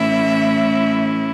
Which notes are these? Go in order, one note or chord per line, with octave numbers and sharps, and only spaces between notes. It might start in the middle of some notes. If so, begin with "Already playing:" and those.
Already playing: A2 E3 A3 C#4 E4 E5